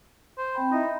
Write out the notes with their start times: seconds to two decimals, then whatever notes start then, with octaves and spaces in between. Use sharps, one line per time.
0.38 C5
0.54 C4 G5 B5
0.71 D#4 E4 D#5 E5
0.83 B5